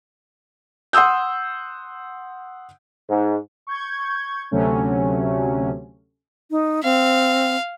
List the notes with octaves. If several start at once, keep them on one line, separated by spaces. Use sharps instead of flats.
F#5 C6 D#6 E6 G6
G#2
C#6 G6 G#6
D2 C3 F#3 A3 C#4
D#4
C4 F5